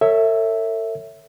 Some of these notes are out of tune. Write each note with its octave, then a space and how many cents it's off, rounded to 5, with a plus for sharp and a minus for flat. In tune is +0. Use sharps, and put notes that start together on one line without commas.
A4 +40 C#5 +0 E5 +0